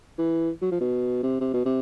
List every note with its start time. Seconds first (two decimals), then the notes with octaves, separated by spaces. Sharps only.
0.19 E3
0.62 F#3
0.71 F3
0.80 B2
1.23 C3
1.41 C3
1.54 B2
1.65 C3